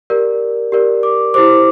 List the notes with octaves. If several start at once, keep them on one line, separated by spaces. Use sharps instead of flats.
G4 A#4 D5
G4 A#4 D5
D6
E4 G4 C5 D6